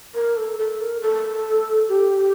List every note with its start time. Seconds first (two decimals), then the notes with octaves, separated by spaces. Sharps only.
0.14 A#4
0.37 A4
0.58 A4
0.80 A#4
1.01 A4
1.89 G4